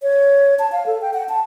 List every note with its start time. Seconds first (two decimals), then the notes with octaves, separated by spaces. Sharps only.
0.03 C#5
0.59 A5
0.72 F5
0.86 A4
1.01 G5
1.14 F#5
1.29 A5